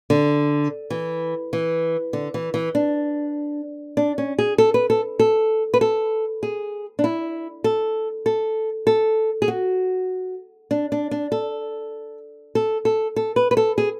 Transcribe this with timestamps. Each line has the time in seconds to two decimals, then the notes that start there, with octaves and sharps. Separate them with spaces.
0.10 D3
0.90 E3
1.53 E3
2.13 D3
2.34 E3
2.54 E3
2.75 D4
3.97 D4
4.18 C#4
4.39 G#4
4.58 A4
4.74 B4
4.90 A4
5.19 A4
5.74 B4
5.81 A4
6.43 G#4
6.99 D4
7.04 E4
7.64 A4
8.26 A4
8.87 A4
9.42 G#4
9.48 F#4
10.71 D4
10.92 D4
11.11 D4
11.32 A4
12.55 A4
12.85 A4
13.16 A4
13.36 B4
13.51 B4
13.57 A4
13.78 G#4